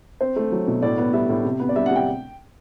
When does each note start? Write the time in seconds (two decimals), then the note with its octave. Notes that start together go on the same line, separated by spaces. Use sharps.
0.21 C4 C5
0.36 A3
0.52 F#3
0.68 B2
0.82 A2 D5
0.98 B3
1.13 G3 E5
1.29 A2
1.44 C3
1.60 B3
1.69 D5
1.76 G3 E5
1.86 F#5
1.91 C3 G5